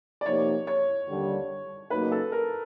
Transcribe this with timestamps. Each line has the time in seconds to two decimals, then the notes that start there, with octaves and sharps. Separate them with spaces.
0.21 D5
0.25 C3 F3 A#3 D#4 G4 C#5
0.67 C#5
1.08 D#2 D3 G3
1.90 C#3 F#3 A#3 D#4 F#4 B4
2.12 A4
2.32 A#4